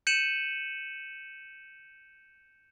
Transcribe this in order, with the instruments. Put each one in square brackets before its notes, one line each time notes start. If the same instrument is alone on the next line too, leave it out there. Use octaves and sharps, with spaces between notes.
[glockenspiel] G6 C#7 D#7 E7 F#7